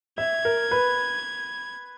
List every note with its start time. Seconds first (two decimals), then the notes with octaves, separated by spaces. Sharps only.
0.18 E5 G#6
0.45 A#4
0.71 B4